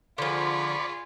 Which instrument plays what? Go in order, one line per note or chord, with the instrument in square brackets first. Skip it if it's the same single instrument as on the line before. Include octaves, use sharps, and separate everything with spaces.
[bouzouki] D3 F3 [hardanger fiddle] F4 G#4 [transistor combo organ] D5 B5 C#6